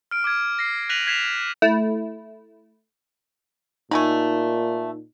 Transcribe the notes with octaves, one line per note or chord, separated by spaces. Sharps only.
F6 D7
D6 F6 G#6
A#6 C7
F#6 A#6 B6 D#7 F7 F#7
G#6 B6 C7 E7 F7
A3 E4
A#2 A3 D#4 G#5 B5